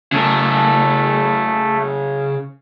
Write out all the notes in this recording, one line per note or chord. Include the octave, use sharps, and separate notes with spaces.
C#3 A3 A#4